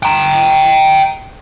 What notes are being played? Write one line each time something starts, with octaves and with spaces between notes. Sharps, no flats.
G5 A#5